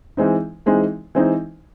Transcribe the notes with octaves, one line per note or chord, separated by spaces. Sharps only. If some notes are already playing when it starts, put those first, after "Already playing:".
E3 G#3 C4 D#4
E3 G#3 C4 D#4
E3 G#3 C4 D#4